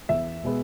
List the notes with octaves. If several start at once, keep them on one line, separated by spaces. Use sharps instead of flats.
E2 E5
B2 G#3 B3